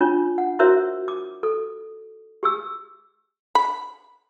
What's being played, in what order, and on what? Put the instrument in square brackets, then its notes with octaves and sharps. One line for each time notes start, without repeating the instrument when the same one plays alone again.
[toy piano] C#4 D4 F4 C#5
F#5
E4 F#4 A#4 C5 C#5 E5
D6
A4
G4 G#4 E6
[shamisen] B5